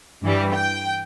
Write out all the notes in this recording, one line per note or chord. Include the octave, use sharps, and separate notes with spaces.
G2 E3 G3
G5